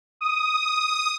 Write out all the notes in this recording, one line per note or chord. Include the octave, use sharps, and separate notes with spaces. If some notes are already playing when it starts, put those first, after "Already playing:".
D#6